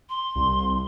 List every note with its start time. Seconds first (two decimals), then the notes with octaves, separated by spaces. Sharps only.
0.09 C6
0.36 C2